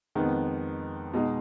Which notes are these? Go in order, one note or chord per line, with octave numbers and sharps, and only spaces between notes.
F2 D#3 G#3 B3
B2 G#3 D#4